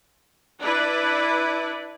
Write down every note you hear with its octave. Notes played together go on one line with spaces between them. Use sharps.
D4 E4 B4